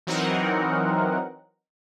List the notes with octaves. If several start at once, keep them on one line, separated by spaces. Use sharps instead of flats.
E3 F#3 C4 D#4 A#4 F#5